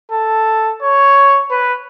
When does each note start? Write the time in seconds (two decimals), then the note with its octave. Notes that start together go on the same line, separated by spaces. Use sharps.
0.12 A4
0.83 C#5
1.51 B4